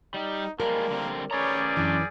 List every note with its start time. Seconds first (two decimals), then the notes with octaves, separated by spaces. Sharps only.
0.14 G3 D#4 G4
0.60 F3 G3 G#3 A#3 A#4
0.90 D3 G3 C4
1.31 G3 C#4 G#4 B4 C#5 D5 A#5
1.77 F#2 E3 D4